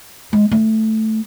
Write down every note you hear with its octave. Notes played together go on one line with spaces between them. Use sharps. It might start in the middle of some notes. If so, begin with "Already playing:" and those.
G#3
A3